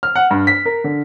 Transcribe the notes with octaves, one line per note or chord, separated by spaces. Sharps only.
F6
F#5
G2
B6
A#4
D3